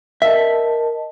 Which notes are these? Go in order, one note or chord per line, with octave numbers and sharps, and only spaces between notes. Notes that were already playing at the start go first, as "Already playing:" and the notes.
A#4 D#5 E5 A5